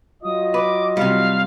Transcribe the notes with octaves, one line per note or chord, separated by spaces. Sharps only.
F#3 F4 D#5 D#6
B4 D6
C3 G3 F5